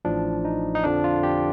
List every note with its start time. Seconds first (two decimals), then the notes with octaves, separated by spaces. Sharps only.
0.05 A1 A2 F3 D4
0.45 D#4
0.75 D#4
0.84 F2 D3 F3 D4
1.04 F4
1.23 G4